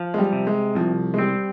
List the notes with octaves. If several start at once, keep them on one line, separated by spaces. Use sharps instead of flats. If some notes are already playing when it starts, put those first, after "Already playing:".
Already playing: F3
G#3
G3
C3
G#3
C2 F3
G#3
G3 C4